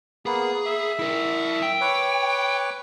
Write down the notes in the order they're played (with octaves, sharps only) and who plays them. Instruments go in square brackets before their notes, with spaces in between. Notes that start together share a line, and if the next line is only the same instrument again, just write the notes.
[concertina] A#3 B3 [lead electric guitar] G#4
[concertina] E5
[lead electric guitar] E4 A#4
G5
[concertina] B4 C#5 D6